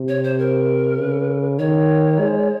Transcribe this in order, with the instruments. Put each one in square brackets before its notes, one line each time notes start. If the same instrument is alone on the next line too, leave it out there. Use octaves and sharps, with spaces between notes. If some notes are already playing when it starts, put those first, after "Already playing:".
Already playing: [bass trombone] C3
[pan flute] C#5
C5
A#4
[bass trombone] C#3
[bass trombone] D#3 [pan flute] C#5
[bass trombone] G#3